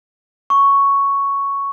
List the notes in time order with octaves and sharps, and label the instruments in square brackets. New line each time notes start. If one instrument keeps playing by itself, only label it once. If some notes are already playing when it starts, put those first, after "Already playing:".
[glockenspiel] C#6